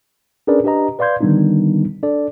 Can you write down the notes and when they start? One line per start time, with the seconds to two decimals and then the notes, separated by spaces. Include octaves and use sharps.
0.47 C#4 D4 G#4 A#4 B4 D5
0.64 D4 G4 B4 D#5 A#5
0.99 B4 D5 F5 C6 G6 G#6
1.21 D3 D#3 G3 B3 D4 D#4
2.03 D4 A4 D5